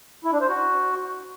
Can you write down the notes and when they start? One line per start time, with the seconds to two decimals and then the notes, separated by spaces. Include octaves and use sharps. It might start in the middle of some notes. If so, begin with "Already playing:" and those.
0.25 E4
0.33 D4
0.41 C5
0.49 F#4